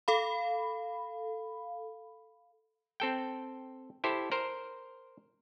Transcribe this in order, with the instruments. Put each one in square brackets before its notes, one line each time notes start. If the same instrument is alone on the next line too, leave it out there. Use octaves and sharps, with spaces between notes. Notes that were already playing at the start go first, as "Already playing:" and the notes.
[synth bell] A4 F5 B5
[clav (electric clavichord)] C4 A4 G5
E4 G4 A4 C5
A#4 C5